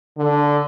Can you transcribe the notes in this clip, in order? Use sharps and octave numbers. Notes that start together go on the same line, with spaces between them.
D3